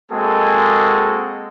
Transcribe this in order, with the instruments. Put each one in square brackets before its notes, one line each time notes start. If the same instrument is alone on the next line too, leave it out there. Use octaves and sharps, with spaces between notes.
[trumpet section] G#3 A#3 C4 F#4 G#4 A4